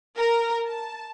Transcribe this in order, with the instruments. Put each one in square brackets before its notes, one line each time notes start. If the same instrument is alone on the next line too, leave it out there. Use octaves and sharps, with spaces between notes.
[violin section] A#4
A5